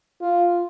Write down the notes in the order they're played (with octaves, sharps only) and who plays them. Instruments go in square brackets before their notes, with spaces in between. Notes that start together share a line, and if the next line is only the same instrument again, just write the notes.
[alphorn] F4